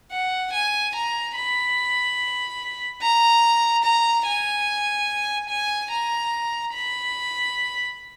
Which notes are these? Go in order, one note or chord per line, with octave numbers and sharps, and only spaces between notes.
F#5
G#5
A#5
B5
A#5
A#5
G#5
G#5
A#5
B5